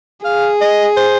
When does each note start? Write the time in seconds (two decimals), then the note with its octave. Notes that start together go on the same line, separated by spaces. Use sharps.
0.25 G#4 F5
0.61 D#5
0.97 C5